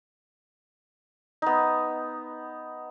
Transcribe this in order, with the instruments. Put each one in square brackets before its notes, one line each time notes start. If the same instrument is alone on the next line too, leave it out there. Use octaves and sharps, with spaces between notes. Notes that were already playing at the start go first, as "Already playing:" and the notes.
[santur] B3 D#4